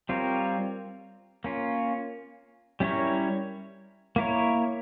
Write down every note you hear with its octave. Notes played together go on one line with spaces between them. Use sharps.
G3 C4 F4 A#4 C#5
A#3 C#4 F4
G3 C#4 E4 A#4 C#5
A#3 E4 A#4 C#5